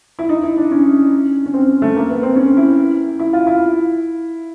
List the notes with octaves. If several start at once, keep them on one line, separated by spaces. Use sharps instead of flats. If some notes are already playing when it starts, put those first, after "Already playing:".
E4
D#4
E4
D4
C#4
C#4
C4
A3
A#3
B3
C4
C#4
E4
E4
F4
E4